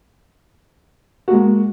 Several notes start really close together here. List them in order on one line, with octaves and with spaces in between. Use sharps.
F#4 A#3 G#3